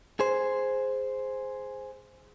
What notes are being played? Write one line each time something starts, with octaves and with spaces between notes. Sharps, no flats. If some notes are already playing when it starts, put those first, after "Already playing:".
G#4 C5